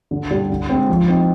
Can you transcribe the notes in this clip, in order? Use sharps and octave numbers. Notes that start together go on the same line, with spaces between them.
D3
G3 D4
D3
G#3 C4
F3
C4 D#4